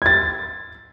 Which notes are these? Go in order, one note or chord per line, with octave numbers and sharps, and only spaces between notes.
G#6 A6